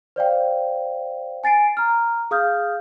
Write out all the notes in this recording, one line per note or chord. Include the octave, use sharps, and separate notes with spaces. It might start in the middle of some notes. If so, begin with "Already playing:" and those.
C5 D5 F5 G5
G#5 A6 C7 D7
A#5 F6
G#4 F5 D#6 F6 G6